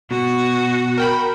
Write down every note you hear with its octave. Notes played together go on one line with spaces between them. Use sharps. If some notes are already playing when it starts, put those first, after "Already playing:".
B2 F#4
A#4 G5 B5